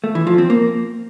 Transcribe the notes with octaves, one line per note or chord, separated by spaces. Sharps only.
A3
E3
F3
C4
A#3